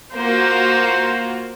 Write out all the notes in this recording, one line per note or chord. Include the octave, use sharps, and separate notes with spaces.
A#3 F4 F#4 C5